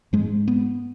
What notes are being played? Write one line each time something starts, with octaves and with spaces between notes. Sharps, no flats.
G#2 G#3
B3